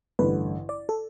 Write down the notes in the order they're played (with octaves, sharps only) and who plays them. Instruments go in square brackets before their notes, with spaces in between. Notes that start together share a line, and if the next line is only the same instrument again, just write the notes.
[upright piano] A1 G2 D3 [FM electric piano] B4
[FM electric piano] D5
A4